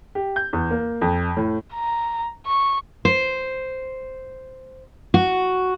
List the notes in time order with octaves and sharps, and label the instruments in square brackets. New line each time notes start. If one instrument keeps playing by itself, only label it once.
[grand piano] G4
G6
E2
A#3
F2
A2
[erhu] A#5
C#6
[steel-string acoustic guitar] C5
F#4